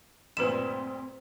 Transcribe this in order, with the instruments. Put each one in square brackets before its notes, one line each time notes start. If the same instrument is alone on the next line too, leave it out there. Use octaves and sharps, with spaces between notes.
[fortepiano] D2 G2 A#2 [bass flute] C4 [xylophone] B4 E7